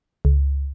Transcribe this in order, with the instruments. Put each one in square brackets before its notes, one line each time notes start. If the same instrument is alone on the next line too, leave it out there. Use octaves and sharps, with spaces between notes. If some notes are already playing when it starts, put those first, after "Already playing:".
[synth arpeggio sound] C#2